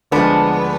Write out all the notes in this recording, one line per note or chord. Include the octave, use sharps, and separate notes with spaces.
D2 D3 F3 G#3 B3 D4